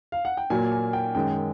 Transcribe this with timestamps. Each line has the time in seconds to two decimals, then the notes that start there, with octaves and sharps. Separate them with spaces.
0.12 F5
0.25 F#5
0.37 G5
0.50 A#2 F#3 A#3 G#5
0.72 G#5
0.93 G5
1.15 F#2 D#3 G#3 G5